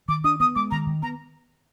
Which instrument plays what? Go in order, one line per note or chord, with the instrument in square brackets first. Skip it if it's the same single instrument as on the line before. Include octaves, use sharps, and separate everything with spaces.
[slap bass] D#3 [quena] D6
[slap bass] D4 [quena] D#6
[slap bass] B3 [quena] D#6
[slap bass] G#3 [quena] D6
[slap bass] D#3 [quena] A#5
[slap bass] D#3
[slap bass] B3 [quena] A#5